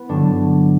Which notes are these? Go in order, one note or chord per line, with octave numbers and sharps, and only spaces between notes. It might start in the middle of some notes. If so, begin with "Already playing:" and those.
Already playing: B3 E4
G2 D3 F#3 D4